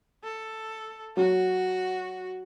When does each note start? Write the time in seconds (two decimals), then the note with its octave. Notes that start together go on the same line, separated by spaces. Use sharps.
0.23 A4
1.17 F#3 F#4